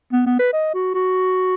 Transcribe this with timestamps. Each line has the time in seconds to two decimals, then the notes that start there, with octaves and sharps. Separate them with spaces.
0.13 B3
0.26 B3
0.39 B4
0.53 D#5
0.74 F#4
0.94 F#4